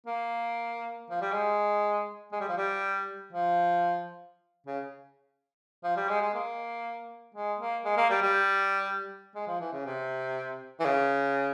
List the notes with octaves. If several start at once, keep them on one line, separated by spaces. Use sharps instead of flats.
A#3
F3
G3
G#3
G#3
G3
F3
G3
F3
C#3
F3
G3
G#3
G#3
A#3
G#3
A#3
G#3
A#3
G3
G3
G#3
F3
E3
C#3
C3
E3
C#3